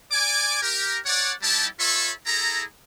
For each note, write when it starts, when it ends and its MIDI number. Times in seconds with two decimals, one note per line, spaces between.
0.12 0.60 74
0.12 0.60 80
0.12 0.60 86
0.62 0.98 67
0.62 0.98 70
1.06 1.33 73
1.06 1.33 74
1.06 1.33 78
1.41 1.67 55
1.41 1.67 63
1.41 1.67 64
1.41 1.67 67
1.41 1.67 81
1.80 2.11 65
1.80 2.11 69
1.80 2.11 73
1.80 2.11 76
1.80 2.11 83
1.80 2.11 85
2.27 2.63 64
2.27 2.63 68
2.27 2.63 69
2.27 2.63 82